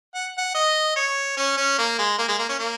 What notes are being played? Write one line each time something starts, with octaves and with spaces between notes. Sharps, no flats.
F#5
F#5
D#5
C#5
C#4
C#4
A#3
G#3
A#3
G#3
A#3
C#4
A#3